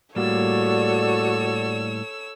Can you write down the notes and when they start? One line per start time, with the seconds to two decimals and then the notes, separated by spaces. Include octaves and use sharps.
0.16 A2 G3 A#3 F#4 A4 C#5 D5 E6